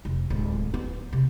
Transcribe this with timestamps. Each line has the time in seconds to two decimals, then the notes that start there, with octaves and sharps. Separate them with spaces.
0.05 F1
0.30 D1 G#3
0.74 B3
1.13 C3